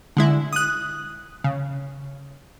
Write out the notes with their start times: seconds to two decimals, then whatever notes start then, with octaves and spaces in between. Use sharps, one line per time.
0.17 D3 G#3 E4
0.53 D#6 F#6
1.44 C#3